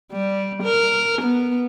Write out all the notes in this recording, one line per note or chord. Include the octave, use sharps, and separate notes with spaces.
G3
A#4
B3